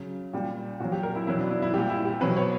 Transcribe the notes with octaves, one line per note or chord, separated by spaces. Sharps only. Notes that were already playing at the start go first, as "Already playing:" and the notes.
Already playing: C#3 F#3
A#2 G3
A#2 F#3 F#4
G4
A#4
E4
B2 F#3 E4
D4
E4
E4
A#2 G3 G4
E4
G4
B2 F#3 B4
C#5